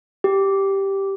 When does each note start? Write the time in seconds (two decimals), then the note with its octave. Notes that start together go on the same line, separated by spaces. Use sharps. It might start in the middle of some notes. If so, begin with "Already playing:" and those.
0.24 G4